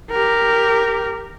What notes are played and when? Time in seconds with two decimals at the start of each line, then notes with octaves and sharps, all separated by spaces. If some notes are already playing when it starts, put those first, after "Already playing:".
0.11 G4 A#4